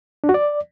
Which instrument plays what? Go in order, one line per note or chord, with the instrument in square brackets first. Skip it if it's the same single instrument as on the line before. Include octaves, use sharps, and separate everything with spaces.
[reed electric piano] D4
F#4
D5